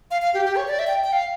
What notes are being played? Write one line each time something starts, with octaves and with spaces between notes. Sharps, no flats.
F5
F5
G4
G4
C#5
D5
E5
G5
G5
F5